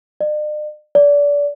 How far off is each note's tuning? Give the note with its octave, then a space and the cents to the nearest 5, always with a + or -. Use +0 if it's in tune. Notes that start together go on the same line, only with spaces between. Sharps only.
D5 +45
D5 -25